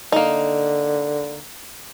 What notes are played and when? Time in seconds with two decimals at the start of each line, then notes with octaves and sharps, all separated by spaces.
0.12 D3 A#3 D#4